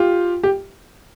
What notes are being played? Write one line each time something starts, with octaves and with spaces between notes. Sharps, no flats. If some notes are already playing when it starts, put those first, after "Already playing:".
Already playing: F4 G4
G4